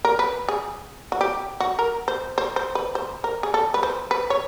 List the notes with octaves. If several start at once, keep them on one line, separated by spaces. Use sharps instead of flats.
A#4
B4
G#4
F#4
G4
F#4
A#4
C5
C5
C5
B4
C5
A#4
G#4
A4
B4
C5
B4
C#5